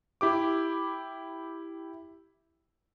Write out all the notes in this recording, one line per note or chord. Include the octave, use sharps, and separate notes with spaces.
E4 G4 D6